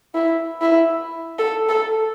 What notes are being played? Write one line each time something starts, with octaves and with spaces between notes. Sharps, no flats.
E4
E4
A4
A4